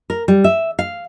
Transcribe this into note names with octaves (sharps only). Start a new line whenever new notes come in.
A#4
G3
E5
F5